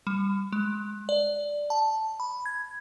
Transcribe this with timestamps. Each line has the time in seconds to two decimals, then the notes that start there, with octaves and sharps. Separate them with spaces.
0.07 G3
0.52 G#3
1.09 D5
1.70 A5
2.20 B5
2.46 G#6